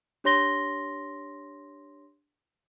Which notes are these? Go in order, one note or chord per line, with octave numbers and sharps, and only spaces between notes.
D4 G4 C#5 C6 A#6 G7